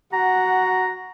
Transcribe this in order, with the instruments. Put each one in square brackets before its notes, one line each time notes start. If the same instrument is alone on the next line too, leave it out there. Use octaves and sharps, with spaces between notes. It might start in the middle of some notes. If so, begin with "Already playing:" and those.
[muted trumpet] F#4 [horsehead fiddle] F#5 [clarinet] A#5